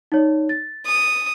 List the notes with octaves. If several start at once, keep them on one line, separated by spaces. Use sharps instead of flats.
D#4 C#5 D5
A6
D#6